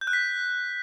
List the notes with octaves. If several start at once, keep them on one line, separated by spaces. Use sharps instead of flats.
G6
F#6
B6